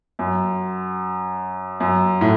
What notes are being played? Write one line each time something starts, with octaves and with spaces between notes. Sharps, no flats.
F#2
F#2
A2